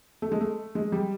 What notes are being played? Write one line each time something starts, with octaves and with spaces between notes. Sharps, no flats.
A3
G#3
A3
G#3
G3